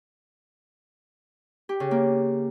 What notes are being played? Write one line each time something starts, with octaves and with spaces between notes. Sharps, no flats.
G4
C#3
A#3